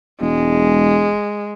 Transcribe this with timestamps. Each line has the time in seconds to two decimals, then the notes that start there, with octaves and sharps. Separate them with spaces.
0.21 E1 G#3